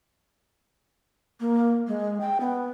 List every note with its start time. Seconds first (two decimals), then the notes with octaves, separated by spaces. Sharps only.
1.40 A#3
1.88 G#3
2.21 G5
2.40 B3